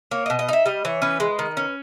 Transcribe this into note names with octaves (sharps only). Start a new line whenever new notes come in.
A#3 C#5
B2 D#5
D#5
D#4 E5
G3 D#5
E3 C#5
C#4 B4
G#3
D#3
C#4